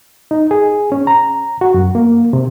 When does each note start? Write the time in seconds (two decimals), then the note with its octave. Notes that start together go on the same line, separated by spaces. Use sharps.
0.31 D#4
0.51 G#4
0.92 C#4
1.07 A#5
1.61 F#4
1.74 F#2
1.95 A#3
2.33 C3